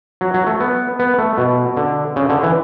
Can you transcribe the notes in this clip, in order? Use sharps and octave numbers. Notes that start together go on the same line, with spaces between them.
F#3
F#3
A3
B3
B3
A3
B2
D3
C#3
D3
E3